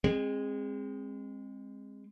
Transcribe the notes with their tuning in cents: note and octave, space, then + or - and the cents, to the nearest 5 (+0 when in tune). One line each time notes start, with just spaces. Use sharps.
G#3 -20 C4 +20